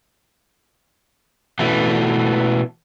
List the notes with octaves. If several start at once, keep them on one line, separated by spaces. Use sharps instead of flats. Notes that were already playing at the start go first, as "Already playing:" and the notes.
B2 E3 A3